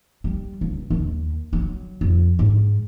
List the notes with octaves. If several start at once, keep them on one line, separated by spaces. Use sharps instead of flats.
G3
C#2
D#2
F#3
F2
G#2